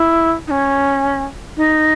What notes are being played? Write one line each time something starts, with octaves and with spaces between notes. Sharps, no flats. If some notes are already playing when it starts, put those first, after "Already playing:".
Already playing: E4
D#4
C#4
D#4